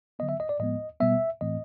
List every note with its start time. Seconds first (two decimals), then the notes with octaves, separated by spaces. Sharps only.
0.19 D3 F#3 B3 D#5
0.29 E5
0.40 D#5
0.49 D5
0.60 A2 F3 G#3 B3 D#5
1.00 B2 G3 B3 E5
1.41 A2 E3 A3 C4 D#5